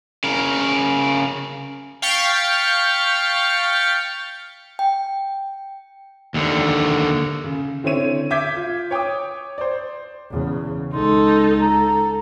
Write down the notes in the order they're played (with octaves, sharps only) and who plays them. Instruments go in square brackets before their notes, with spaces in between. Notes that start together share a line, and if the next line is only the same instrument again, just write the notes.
[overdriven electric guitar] C#3 A#4
[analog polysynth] F5 G5 C#6 A6 B6 C#7
[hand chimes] G5
[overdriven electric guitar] D#2 D3
[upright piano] C#3
D3 C4 E4 C#5 D#7
E5 D6 G6 G#6 B6
F4
C#5 G5 D6 D#6
C5 D5
[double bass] E2 C#3
[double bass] C#2 [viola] D#4 A4 [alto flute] C6
[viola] A4 [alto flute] A#5